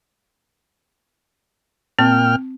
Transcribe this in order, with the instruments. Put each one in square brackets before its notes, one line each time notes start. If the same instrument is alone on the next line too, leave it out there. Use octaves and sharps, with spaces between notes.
[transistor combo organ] A#2 G5 F6 [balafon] C4